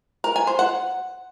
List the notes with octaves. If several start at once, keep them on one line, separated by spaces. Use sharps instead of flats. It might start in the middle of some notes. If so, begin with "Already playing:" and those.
A#4
G#5
C5
F#5